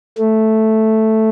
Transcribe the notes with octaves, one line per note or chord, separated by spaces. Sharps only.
A3